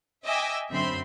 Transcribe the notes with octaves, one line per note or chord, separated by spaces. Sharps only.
D#5 E5 G5 G#5 D6 E6
F#2 D3 C4 E5 B5 C6